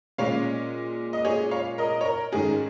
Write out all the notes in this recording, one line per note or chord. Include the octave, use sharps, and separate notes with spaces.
A#2 G#3 C#4 C#5 F5
D#5
G#4 C#5
C#5 F5
A#4 D#5
C#5
A#4
G#2 D#3 C#4 G#4